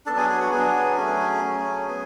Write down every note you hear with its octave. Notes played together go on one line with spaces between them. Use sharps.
F#3 B3 D4 A4 A5
G#4 G#5
G#4 G#5
F#4 F#5
F#3 B3 D4 G#4 G#5
F#3 A3 C#4 G#4 G#5
F#3 A3 C#4
B3